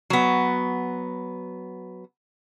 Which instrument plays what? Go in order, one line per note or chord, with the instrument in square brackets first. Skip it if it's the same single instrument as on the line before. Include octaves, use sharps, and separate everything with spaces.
[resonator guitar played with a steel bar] F#3 B3